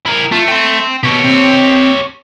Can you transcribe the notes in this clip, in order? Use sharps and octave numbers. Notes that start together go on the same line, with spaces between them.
E4 A#4
A3 F4
G5 C6
B2 G4 C#5
C4